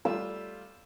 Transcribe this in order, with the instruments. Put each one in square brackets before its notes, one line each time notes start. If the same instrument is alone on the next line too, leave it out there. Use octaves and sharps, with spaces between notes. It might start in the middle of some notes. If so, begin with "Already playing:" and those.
[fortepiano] G3 A3 F4 [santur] E6